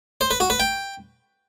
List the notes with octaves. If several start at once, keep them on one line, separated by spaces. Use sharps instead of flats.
C5
B4
F#4
B4
G5